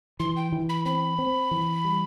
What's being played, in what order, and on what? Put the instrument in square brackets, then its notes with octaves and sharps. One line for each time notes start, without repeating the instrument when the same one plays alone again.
[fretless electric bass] E3 [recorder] C6
[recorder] G5
[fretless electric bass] E3
[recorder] B5
[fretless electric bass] C4 [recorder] B5
[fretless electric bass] C4
E3
G3